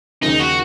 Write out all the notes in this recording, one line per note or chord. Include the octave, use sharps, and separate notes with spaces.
D#2 C#3 F3 A#3 C#4 D#4
F#4